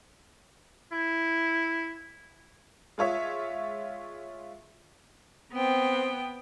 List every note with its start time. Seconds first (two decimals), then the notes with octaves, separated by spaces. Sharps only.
0.92 E4
2.98 G#3 F4 C#5 E5
5.52 B3 C4 G5